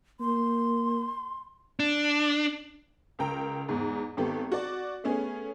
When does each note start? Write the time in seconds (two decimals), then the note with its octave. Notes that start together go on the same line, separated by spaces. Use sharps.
0.20 A#3 C6
1.80 D4
3.19 C#2 A#4 G5 A#5
3.69 E2 G#2
4.17 G#1 B3 G4 A4
4.52 F#4 D5
5.04 A3 B3 C#4 G#4